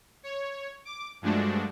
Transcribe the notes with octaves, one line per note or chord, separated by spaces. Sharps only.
C#5
D6
G2 F3 G#3 A3 D4 F#4